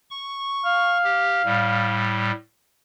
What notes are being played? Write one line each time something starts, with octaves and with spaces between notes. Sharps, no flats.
C#6
F5
G4
A2 G3